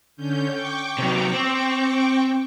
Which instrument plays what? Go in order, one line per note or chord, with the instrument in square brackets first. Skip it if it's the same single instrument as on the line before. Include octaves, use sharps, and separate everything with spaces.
[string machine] D3 C#4 G6
G5 C#6 D6
[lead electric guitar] C3 F#3
C4